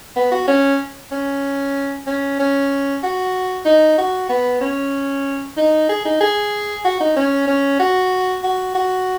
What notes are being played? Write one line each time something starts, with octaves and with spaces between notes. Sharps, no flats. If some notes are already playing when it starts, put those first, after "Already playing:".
B3
F#4
C#4
C#4
C#4
C#4
F#4
D#4
F#4
B3
C#4
D#4
G#4
D#4
G#4
F#4
D#4
C#4
C#4
F#4
F#4
F#4